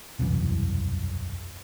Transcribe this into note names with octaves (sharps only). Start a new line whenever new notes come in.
E1 C2 F#2 E3